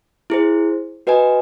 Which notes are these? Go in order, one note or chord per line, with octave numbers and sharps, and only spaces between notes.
E4 G#4 C5
F#4 B4 D#5 G#5